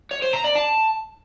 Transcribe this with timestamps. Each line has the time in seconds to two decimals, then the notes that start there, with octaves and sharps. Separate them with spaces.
0.11 C#5
0.22 C5
0.33 A#5
0.44 D5
0.55 A5